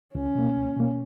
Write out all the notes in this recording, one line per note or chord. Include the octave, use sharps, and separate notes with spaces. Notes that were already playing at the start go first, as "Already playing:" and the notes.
C#2 C#4
B2 A#3
C#2
B2 A#3